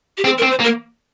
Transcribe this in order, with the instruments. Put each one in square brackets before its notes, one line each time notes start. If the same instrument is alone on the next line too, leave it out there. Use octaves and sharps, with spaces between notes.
[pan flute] G4
[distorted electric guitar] C4 [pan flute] G#4
[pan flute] A#4
[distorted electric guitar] C4
[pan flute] C5
[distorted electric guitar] A#3
[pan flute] A#4